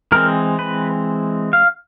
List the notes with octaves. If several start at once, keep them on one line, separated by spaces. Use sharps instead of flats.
E3 G#3 C4 A#4
B4
F5